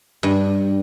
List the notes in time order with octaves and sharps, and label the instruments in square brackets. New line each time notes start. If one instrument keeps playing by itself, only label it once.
[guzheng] G2